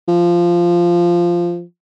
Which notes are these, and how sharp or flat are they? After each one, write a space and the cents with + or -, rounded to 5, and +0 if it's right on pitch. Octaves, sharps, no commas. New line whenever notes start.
F3 -10